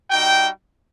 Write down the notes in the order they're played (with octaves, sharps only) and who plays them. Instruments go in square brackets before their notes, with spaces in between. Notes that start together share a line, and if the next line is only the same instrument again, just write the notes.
[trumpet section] G3 D#4 F#4 G5